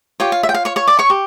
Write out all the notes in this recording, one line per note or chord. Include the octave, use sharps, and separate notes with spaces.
F4 G4 C#5 G5
F5
E5
G5
F5
C#5 C#6
C#5 C#6
D5 D6
C#5 C#6
G4